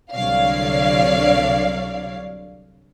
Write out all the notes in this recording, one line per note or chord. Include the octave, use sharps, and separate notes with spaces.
C2 D3 F#3 C#5 D5 F5